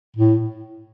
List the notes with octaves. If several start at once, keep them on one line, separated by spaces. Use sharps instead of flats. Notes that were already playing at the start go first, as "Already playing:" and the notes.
A2